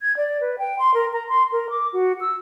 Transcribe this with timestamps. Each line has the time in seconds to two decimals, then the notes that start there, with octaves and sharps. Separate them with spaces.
0.01 G#6
0.17 D5
0.41 B4
0.59 G5
0.79 C6
0.94 A#4
1.13 A#5
1.29 C6
1.52 A#4
1.70 D6
1.93 F#4
2.21 E6